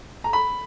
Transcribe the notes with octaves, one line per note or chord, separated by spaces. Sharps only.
A#5
B5